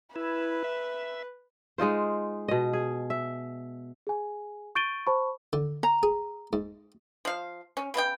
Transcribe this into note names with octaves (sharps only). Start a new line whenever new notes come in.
E4 B4
E5
G#3 D#4 F4 C5
B2 D#5
G#4
E5
G#4 G#5
C#6 G6 A6 D7 D#7 G7
C5 A5 B5 C#6
D3
A#5
G#4
G#2
F3 F5
C#4
C#3 B3 F4 G5